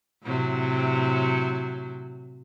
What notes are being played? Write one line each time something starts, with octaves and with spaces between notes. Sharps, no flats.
A2 C3 F#3